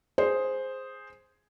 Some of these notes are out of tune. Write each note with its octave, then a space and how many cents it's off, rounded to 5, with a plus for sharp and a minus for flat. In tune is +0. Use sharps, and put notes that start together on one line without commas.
G#4 +0 C5 +0